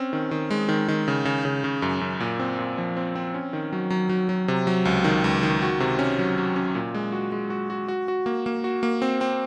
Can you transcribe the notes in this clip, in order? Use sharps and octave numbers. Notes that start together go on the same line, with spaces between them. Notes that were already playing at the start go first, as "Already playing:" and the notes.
Already playing: C4 C#4
D#3
D#3
G#3
D#3
D#3
C#3
C#3
C#3
C#3
F#2
F#2
A#2
C4
A#2
F3
C4
C4
C#4
D#3
F#3
F#3
F#3
F#3
C3
F#3
C#2
D#3
C#2
D#3
F#4
C3
C#4
F#3
F#3
C#4
A#2
G#3
F#4
G#3
F#4
F#4
F#4
F#4
A#3
A#3
F#4
A#3
C4
C4